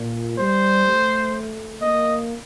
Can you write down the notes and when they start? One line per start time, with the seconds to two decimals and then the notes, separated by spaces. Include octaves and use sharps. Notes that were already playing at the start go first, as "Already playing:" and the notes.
Already playing: A#2
0.39 G3 C5
0.87 A3
1.82 A#3 D#5